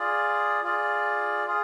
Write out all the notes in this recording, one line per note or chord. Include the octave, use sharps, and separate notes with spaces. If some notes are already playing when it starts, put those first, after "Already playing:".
Already playing: F4 G#4 D5
F4 G#4 D5
F4 G#4